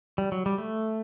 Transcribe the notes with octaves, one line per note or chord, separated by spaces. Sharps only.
G3
F#3
G3
A3